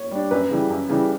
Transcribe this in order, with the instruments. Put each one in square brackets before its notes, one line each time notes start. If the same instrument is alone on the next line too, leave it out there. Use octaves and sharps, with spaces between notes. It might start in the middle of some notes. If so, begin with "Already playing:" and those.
Already playing: [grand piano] C#5
[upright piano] G3 D4
[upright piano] F#2 [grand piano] B4
[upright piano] C#3 E3 G3
F#2
C#3 E3 G3